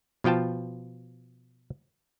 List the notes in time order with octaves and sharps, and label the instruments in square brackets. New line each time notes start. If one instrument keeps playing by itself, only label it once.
[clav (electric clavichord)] B2 F3 F4 G5 A5